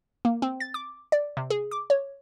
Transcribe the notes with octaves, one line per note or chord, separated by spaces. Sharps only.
A#3
C4
A6
D6
D5
C3
G#4
D6
C#5